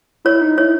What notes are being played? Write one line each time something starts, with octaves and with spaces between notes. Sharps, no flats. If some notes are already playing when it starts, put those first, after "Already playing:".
E4 C#5
D#4
E4 C#5